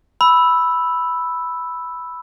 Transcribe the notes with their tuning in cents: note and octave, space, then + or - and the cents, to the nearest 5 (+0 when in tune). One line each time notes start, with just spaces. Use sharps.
B5 +0 E6 +0